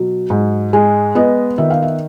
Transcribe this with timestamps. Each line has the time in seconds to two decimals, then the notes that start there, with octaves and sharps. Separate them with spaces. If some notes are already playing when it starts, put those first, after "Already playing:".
Already playing: B2 F#3
0.30 G#2
0.73 G#3
1.15 B3 D#5
1.58 D#3 E5
1.70 F5
1.82 E5